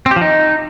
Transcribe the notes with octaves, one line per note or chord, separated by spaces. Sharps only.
C4
G4
F3
D#4